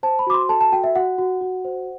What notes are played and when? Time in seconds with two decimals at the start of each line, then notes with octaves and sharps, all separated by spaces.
0.03 C5 A5
0.19 B5
0.27 F#4 D6
0.34 C6
0.49 A4 A5
0.61 A5
0.72 F#4 G5
0.84 E5
0.95 F#4 F#5
1.18 F#4
1.41 F#4
1.65 C5